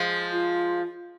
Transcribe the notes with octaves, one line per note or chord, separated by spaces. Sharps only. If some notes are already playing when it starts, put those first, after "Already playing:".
Already playing: F3 G#3
F4